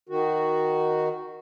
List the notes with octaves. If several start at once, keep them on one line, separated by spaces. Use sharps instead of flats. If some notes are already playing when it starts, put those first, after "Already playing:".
D#3 F#4